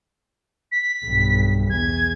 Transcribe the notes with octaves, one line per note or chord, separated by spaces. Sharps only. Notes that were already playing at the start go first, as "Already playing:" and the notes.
B6
B1 G2
E2 G#6